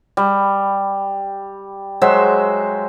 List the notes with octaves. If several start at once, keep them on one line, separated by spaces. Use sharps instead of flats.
G3
F#3 G#3 C5 E5